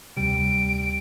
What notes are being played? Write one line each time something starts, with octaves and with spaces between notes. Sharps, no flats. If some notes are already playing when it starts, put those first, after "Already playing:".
D2 C3 G3 D7